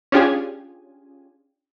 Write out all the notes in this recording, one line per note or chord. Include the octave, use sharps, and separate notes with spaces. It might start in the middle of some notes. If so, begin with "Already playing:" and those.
C#4 D4 F4 G4 G#4 G#5